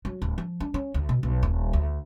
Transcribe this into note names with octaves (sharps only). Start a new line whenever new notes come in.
F#3
D1
F3
D4
C#4
D2
B2
B1
D#1
D2